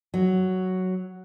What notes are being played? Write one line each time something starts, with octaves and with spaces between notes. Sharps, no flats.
F#3